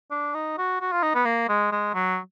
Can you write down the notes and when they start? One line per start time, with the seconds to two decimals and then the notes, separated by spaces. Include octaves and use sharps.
0.11 D4
0.34 D#4
0.58 F#4
0.81 F#4
0.92 F4
1.03 D#4
1.14 B3
1.25 A#3
1.49 G#3
1.72 G#3
1.94 F#3